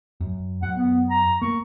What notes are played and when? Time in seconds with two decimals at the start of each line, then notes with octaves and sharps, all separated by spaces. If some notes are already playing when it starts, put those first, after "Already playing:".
0.21 F#2
0.62 F#2 F#5
0.77 B3
1.10 A#5
1.42 A#3 C#6